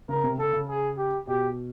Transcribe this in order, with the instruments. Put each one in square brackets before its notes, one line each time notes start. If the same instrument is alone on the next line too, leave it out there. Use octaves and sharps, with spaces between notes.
[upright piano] C#3 [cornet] A#4
[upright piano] C3
[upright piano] C#3 [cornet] A4
[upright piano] C#3
[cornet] G#4
G4
[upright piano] B2 [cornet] G4